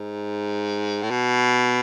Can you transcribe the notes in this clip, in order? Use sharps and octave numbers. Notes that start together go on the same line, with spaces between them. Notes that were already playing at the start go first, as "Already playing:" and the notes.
Already playing: G#2
A2
B2